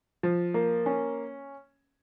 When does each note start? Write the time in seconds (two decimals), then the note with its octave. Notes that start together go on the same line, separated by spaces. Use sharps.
0.23 F3
0.54 A#3
0.86 C#4